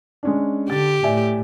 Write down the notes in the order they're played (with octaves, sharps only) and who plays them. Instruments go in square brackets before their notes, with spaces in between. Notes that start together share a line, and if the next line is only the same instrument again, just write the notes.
[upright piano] G#3 C#4 D4
[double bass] D3 [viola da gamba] G4 [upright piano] A6
[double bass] A2 [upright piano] D5 E5 G#5